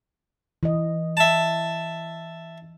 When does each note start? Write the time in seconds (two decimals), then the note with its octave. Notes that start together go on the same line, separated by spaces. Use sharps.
0.63 E3 D#5
1.17 E5 A5